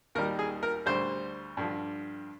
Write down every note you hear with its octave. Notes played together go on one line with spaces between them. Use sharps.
D#2 D#3 G3 A#4
G#4
A#4
D2 D3 G3 C5
G2 D3 F3